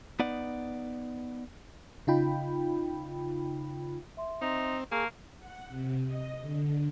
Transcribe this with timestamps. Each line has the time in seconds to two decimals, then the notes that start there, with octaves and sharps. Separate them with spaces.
0.20 B3 D#4 D5 F#5
2.07 C#3 D#4 F4 G5 B5
4.17 E5 C6
4.41 C4 D#4
4.92 A#3 G#4 A5 A#5 C#6
5.39 F#5
5.69 C3
6.07 D#5
6.41 D3